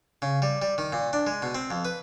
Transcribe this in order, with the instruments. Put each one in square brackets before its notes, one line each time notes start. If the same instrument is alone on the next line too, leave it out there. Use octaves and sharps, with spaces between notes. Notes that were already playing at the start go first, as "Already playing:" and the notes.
[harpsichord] C#3
G3
G3
D#3
A#2
D4
G#3
B2
C4
F2
B4